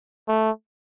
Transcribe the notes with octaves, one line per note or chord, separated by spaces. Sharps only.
A3